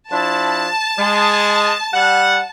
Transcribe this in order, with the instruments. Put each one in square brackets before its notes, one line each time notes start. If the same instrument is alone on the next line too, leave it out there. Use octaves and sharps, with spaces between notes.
[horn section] F3 D4 E4 [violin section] A5
[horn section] G#3
G3 F#5